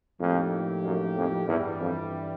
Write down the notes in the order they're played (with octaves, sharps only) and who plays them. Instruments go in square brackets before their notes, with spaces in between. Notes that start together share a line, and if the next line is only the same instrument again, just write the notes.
[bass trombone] F2 [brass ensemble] A2 F3 A#3 D#4 G4
[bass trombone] F#2
F2
[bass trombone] E2 [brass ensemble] G2 E3 G3
[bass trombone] F2